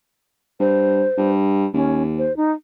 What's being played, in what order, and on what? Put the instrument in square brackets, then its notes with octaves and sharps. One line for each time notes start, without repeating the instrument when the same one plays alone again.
[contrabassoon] G2 [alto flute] C5
[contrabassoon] G2
[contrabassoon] D#2 [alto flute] C#4
[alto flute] C5
D#4